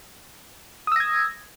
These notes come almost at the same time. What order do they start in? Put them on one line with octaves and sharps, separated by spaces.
D#6 E6 A#6 G#6